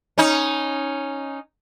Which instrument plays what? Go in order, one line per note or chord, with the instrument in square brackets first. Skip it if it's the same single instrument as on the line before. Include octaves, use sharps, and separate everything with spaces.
[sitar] C#4 D#4